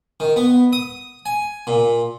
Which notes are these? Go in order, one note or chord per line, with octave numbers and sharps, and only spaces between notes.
D#3
B3
D#6
G#5
A#2